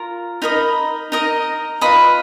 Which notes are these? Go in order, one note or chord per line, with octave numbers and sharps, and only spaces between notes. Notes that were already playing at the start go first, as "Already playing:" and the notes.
Already playing: F4 A#4
D#4 A#4 D#5 B5
D#4 A#4 D#5
F4 B4 D#5 B5